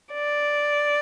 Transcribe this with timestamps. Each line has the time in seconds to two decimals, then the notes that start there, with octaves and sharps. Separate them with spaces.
0.14 D5